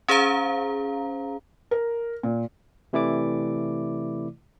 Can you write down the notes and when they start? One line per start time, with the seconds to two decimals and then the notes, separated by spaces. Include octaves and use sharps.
0.08 C#4 G#4 C5 F5 A#5
1.71 A#4
2.23 A#2
2.93 C3 E3 A3 E4 D5 D6